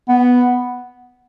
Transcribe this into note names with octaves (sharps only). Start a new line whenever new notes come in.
B3